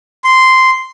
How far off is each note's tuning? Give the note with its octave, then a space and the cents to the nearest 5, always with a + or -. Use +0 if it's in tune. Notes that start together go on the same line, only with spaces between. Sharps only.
C6 -10